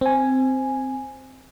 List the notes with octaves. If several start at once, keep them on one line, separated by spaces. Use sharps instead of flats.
C4 G#5